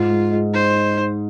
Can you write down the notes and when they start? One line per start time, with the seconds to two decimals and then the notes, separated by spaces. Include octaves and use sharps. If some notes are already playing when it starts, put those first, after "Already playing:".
Already playing: G#2 F4
0.10 G#3
0.32 G#3
0.54 D#4 C5
0.75 D#4
0.98 D#4